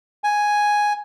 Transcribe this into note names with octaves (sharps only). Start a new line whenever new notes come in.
G#5